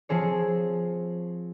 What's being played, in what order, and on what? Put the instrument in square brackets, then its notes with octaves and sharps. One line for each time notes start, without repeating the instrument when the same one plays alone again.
[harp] F3 C4 G#4 C#5